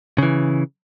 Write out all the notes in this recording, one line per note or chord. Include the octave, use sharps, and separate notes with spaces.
C#3 E3